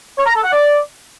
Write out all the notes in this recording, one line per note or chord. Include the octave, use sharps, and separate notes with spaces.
C#5
A#5
A4
F#5
D5